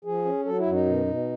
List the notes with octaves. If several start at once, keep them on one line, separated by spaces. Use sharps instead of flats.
F3 G#4
C#4
F#3 A4
E4
F#2
D#4
B2
B2